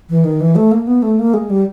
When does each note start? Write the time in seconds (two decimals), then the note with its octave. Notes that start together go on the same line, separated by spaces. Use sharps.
0.10 E3
0.24 D#3
0.41 E3
0.56 A3
0.72 A#3
0.87 B3
1.02 A3
1.19 A#3
1.34 G#3
1.50 G3